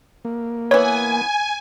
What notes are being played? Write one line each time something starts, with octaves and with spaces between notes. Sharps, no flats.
A#3
E3 B3 C#5 G#5